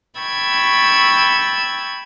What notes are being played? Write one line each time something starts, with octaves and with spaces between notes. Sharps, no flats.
G5 B5 C#6 E6 G#6 A6